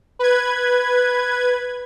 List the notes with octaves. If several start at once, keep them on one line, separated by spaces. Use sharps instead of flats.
B4 G#6